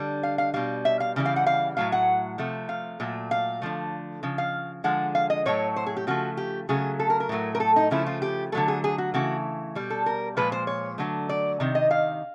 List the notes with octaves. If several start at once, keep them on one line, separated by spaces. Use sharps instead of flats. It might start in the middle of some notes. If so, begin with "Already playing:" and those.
Already playing: D3 G3
F5
F5
B2 G3 F5
E5
F5
C#3 E3 G3
F5
F#5
F5
A2 F#3 A3 F5
F#5
C3 F3 A3
F5
A#2 F#3 A3
F5
D3 F3 A3
C#3 F3
F5
D3 F3 G#3 F#5
F5
D#5
A2 F#3 A3 C#5
C5
G#4
G4
C#3 F3 A3 F#4
G4
C#3 F#3 A3 G#4
A4
A#4
A#4
A2 F#3 A3
A#4
A4
D#4
C#3 F3 A3 E4
F4
G4
D3 F#3 A3 A4
G#4
G#4
F#4
C#3 E3 A3 F#4
B2 G3
A4
A#4
A#2 F3 G#3 B4
C5
C#5
D3 F#3 A3
D5
C3 D#3
D#5
F5